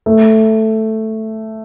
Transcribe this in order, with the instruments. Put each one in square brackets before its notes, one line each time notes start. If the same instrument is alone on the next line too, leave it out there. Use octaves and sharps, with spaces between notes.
[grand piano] A3